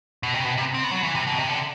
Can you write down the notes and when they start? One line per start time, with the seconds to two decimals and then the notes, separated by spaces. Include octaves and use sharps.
0.23 B2
0.34 C3
0.45 B2
0.58 C3
0.74 C4
0.84 B3
0.91 F#3
1.03 E3
1.15 C3
1.27 B2
1.38 C3
1.49 D3